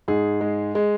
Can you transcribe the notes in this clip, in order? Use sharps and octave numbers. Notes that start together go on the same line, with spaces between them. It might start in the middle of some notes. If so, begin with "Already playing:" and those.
G#2 G#4
G#3
G#3